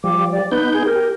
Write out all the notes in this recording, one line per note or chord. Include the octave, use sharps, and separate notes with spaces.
F3 G3 D6
D5
B3 D#4 B4 G6
G#4
G4 A#4